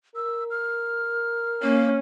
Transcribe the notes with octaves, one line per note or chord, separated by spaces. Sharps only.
A#4 E6
F6
A#3 C#4